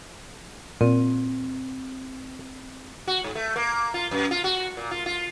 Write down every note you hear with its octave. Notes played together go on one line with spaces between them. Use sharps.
A#2 C4
F#4
G#2
A3
A#3
F4
F#2
F4
F#4
A#2
F4
F4